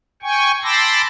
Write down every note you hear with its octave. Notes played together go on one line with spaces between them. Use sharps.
G5 G#5 C#6
A5 B5 C6 D6 E6 A#6